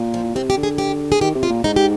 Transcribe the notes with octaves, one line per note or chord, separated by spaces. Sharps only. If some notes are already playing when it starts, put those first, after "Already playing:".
Already playing: A#2
F3
C3 C4
G4
D3
G#4
G4
G#4
D#3 G4
C3
F4
A#2
G#2 D#4
G4